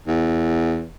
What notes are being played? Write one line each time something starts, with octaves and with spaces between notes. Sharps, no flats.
E2